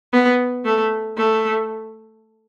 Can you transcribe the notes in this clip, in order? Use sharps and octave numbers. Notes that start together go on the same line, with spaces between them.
B3
A3
A3